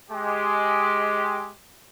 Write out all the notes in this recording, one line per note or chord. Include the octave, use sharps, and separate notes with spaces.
G#3 G4